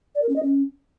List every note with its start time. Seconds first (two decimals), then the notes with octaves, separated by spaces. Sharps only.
0.15 D5
0.22 A#4
0.29 C#4
0.36 D#5
0.43 C#4